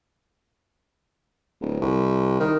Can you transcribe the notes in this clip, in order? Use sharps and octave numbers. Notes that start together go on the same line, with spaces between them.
D1
C2
D#3